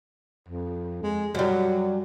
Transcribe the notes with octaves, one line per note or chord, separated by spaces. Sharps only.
F2
G#3
F#2 F#3 G3